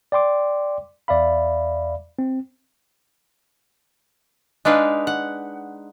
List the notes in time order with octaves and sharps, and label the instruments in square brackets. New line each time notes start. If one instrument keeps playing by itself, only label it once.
[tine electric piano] D5 G5 C6 D6
E2 D5 E5 F5 B5
C4
[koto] G#3 D4 D#4 B4 F5
F#5